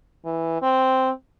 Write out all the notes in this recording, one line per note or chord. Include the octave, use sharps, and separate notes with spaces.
E3
C4